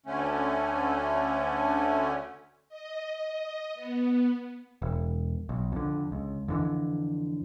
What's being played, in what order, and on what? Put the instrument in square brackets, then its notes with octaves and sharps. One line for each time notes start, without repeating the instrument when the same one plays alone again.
[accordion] D2 D3 A3 C#4
[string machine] D#5
B3
[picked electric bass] E1
B1
F2 D3
C#2
F2 D3 E3